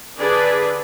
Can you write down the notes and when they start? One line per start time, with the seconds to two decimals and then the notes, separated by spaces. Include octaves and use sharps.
0.17 D3 D4 G#4 B4 D5